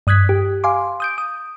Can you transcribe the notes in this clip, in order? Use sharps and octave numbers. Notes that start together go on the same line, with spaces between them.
G2 D#6 F#6 G#6 B6
G4
F5 G#5 C6 D6
D#6 G6 D7
D#6